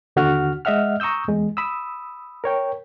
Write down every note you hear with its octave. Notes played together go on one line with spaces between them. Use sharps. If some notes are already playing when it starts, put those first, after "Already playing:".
D#2 D3 F#4 F#5 F6
G#3 D#5 E5 F#5 F6
A#5 C#6 D#6 E6 G6
E2 G#3
B5 D#6 E6
A#4 C#5 G5